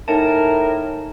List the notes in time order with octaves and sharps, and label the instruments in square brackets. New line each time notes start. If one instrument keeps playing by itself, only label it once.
[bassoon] A2 [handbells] D#4 G#5 A5 [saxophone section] A#4